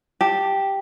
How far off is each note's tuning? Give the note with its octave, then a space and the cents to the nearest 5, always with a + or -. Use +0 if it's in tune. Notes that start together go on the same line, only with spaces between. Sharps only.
G4 +0 A5 +0